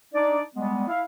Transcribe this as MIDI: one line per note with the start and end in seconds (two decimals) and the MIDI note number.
0.14 0.40 62
0.14 0.40 63
0.14 0.40 74
0.55 0.86 55
0.55 0.86 56
0.55 0.86 59
0.88 1.01 64
0.88 1.01 77